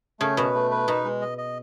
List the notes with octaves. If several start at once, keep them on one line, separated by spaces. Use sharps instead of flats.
C#3 A3
B2 B4
A3
B4
B2 D#4
G#3
D#5
D#5